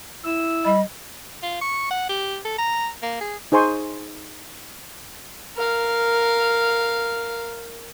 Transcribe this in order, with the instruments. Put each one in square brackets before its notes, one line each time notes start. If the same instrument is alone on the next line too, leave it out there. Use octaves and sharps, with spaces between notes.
[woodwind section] E4 E6
[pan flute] G3 [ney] D#5 [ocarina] B5
[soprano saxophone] F4
C#6
F#5
G4
A4
A#5
A#3
G#4
[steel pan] D#4 G#4 C5 G#5 C6 C#6
[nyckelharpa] A#4 F5